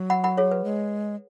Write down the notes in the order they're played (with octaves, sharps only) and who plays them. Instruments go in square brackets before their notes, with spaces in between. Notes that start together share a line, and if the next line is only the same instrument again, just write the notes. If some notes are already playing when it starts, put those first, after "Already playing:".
Already playing: [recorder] F#3
[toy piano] F#5 B5
F#5 B5
G#4 C#5
B4
[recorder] G#3